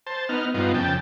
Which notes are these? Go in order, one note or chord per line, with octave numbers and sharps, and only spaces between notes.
C5 A5
B3 D#4 F6
G2 B3 D#4 F4
F2 C#3 G5 A5